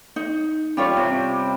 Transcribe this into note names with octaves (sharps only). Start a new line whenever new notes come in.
D#4
G3 C#4 F4 C#5
C3